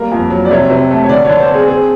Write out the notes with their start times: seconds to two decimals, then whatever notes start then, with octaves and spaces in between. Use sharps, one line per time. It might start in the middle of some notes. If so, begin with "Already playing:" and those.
Already playing: G3 A#3 A#4
0.12 F2
0.30 F#3
0.45 D5
0.51 C3 C#5
0.70 C3
0.91 A3
1.04 C#5
1.09 D3 D5
1.25 D3 C#5
1.39 C5
1.49 C4
1.54 G#4
1.68 C4 G#4